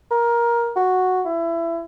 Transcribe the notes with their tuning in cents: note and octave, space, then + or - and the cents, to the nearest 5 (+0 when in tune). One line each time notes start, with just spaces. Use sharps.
A#4 +15
F#4 -5
E4 +25